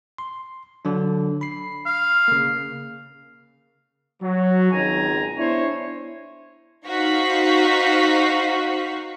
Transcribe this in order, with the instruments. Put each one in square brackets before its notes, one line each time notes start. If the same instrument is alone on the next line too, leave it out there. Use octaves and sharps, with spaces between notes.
[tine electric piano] C6
D3 F#3 D4
B5 C7
[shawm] F5
[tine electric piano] C#3 A#3
[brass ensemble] F#3
G#1 C#2 D#3 G#5 A#5
B3 D4 E4 C5 C#5
[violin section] D#4 F#4 C5 F5 C#6 B6